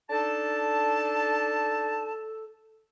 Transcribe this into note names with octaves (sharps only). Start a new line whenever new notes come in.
D4 D#4 A4 A5